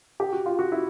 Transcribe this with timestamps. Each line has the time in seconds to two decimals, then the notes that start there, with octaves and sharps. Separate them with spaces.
0.20 G4
0.33 F#4
0.46 F4
0.59 F#4
0.72 E4